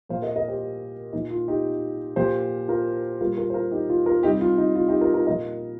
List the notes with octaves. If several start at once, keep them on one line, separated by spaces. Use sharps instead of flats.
A#2 F3 C5 F5
A#4 D#5
A#4 D#5
G4 C5
A#2 F3 D#4
F4
D#4 G4
A#2 F3 G4 C5
F4 A#4
A#2 G3 F4 A#4
F4 A#4
C5
F4 A#4
D#4 G4
F4
F4 A#4
C3 G3 D#4 G4
F4
D#4
F4
D#4 G4
F4 A#4
F4 A#4
A#2 F3 A#4 D#5